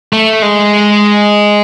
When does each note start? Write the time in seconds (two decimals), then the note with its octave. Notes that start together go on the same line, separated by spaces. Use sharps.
0.13 A3
0.42 G#3